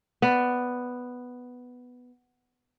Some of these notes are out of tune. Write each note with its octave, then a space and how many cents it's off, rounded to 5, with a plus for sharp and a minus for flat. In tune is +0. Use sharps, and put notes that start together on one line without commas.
B3 +5 D5 +0